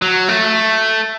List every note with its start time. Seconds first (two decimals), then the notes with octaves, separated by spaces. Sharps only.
0.02 F#3
0.29 A3